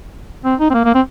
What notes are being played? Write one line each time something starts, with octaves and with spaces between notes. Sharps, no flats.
C4
D#4
C4
A#3
A#3
C4